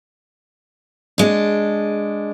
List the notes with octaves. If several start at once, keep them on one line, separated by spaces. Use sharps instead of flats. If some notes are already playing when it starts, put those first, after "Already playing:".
G#3 D4